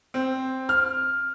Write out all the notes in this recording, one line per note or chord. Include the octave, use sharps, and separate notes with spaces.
C4
F6